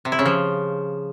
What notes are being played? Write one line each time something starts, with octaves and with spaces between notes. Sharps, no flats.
C3
E4
C#3
F3